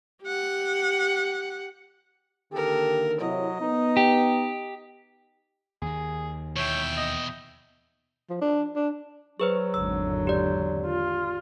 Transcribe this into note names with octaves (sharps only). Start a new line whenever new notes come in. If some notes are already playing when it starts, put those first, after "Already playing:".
G4 F#5
D3 D#3 A#3 G4 A4 A#4
C3 F#3 E4 C#5 D#5
B3 D#4
G4
D#2 D#3 G#4
E2 B2 C#5 E5 G5
D#5
F3
D4
D4
F#3 G#4 B4 C5
G#1 E2 D3 E6
G4 D5
F4